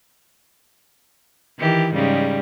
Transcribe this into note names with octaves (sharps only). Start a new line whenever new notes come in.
D#3 E3 G4
G#2 C#3 G3